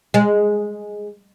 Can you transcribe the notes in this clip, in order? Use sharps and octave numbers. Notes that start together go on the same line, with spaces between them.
G#3